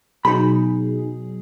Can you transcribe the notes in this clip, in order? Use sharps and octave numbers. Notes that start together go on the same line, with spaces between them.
B2 F#3 D#4 G#4 B5